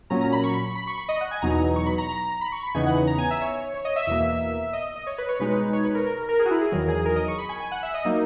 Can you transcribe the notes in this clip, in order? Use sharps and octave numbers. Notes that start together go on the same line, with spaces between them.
A#2 F#3 C#4 A#5
A#5
B5
C#6
B5
B5
C#6
B5
D#5
F#5
G#5
E2 B2 F#3 B3 D#4 A#5
C#6
B5
A#5
A#5
B5
C#6
B5
E2 C#3 E3 B3 D#4 G#5
F#5
A#5
G#5
E5
C#5
C#5
D#5
E5
E2 B2 A#3
D#5
D#5
C#5
B4
C#5
B2 G#3 D#4 B4
C#5
B4
A#4
A#4
A#4
A#4
G#4
F#4
E4
G#4
E2 D#3 F#3 A#4
G#4
A#4
D#5
C#6
B5
G#5
G#5
F#5
E5
D#5
F#3 A#3 D#4